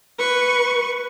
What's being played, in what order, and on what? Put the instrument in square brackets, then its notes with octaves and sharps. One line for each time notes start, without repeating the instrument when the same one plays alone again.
[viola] B4 C#6